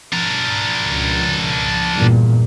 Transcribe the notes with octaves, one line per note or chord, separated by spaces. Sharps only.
D4 A#4
C#2
E2 G2 A#2